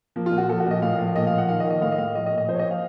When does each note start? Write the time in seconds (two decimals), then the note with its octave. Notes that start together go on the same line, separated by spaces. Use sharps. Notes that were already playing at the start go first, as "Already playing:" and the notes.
0.16 F3 A#3
0.26 F4
0.32 A#2
0.38 F#4
0.49 F3 A4
0.60 F#4
0.66 A#2 D#5
0.82 A2 F5
0.99 F3
1.15 A#2 D#5
1.27 F5
1.32 F3
1.38 F#5
1.49 D#3 F5
1.60 D#5
1.65 D#3
1.70 D#5
1.81 A2 F5
1.92 D#5
1.98 A2 F5
2.15 F3 D#5
2.26 D#5
2.32 A#2
2.38 D#5
2.48 F3 C5
2.55 C#5
2.59 D#5
2.66 F3 F5